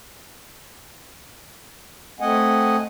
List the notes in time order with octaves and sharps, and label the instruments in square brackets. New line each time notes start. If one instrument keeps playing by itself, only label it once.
[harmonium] A3 C4 D#5 F#5 G#5